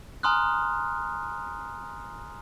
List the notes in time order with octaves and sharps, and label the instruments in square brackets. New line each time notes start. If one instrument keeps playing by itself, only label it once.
[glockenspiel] G#5 A#5 C6 D#6 F6 F#6